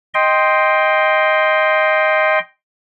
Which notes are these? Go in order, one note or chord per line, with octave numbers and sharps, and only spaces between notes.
D#5 G5 C6